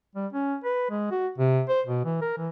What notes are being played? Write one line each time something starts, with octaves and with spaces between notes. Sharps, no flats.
G3
C#4
B4
G#3
F#4
C3
C5
B2
E3
A#4
E3